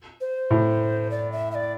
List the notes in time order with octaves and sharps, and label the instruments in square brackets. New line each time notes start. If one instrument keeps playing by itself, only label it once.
[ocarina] C5
[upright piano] A2
[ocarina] D5
E5
E5
D5